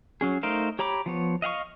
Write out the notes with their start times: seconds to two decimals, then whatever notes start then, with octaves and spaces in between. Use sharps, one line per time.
0.21 F#3 C#4 G#4
0.43 A3 D#4 A#4 C5 F5
0.79 G4 C#5 A#5 B5 D6
1.06 F3 B3 C#5
1.42 D#5 F5 F#5 C#6